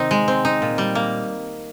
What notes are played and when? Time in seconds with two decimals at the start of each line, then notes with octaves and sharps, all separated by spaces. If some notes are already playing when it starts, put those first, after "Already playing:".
Already playing: C3 D#3 C4 D#4
0.11 G#3
0.28 C4
0.45 D#4
0.62 A#2
0.78 G3
0.95 A#3